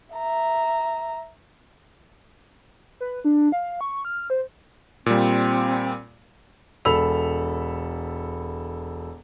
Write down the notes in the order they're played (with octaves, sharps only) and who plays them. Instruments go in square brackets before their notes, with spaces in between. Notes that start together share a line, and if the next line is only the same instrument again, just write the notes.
[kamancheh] E5 A#5
[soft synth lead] B4
D4
F5
C#6
F6
C5
[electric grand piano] A#2 G3 [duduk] C4
[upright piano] E1 A4 B5 E6 F7